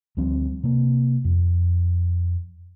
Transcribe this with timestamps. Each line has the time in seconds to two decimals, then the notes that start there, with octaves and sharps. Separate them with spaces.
0.17 D2 F3 G3 C4
0.63 C3 A#3
1.25 F2